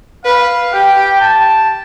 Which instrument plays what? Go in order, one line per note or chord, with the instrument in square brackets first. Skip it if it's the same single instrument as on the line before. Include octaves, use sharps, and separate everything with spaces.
[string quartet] B4 [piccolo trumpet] F5
[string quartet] G4 [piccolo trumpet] G5
[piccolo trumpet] A5